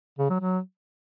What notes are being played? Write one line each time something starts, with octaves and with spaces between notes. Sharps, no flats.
C#3
F#3
F#3